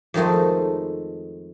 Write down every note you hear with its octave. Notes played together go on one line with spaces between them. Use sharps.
F2 D#3 G#3 A3 D#4